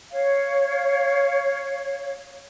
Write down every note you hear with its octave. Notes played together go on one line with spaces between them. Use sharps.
C#5 F5